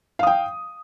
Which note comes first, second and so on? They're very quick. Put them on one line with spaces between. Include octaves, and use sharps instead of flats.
F5 D#6 G5